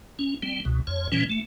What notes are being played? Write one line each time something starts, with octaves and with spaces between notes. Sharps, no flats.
C#4
G3 C4
C#2 B2
F2 C#5
A#2 E3 G3 C#4
A3